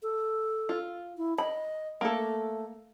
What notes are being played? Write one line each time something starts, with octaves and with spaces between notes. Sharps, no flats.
A4
F4
E4
D#5 B5
A3 A#3 A4